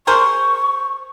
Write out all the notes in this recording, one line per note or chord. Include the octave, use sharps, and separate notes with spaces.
G#4 A#4 C5 C#6